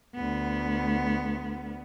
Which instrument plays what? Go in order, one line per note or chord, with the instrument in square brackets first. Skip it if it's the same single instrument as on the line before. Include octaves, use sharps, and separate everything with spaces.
[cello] D2 B3